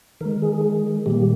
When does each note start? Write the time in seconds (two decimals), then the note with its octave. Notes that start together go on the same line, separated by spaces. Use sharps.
0.21 D#3 A#4
0.25 G#3
0.42 G#4
1.06 A#2 G3 A#3 G4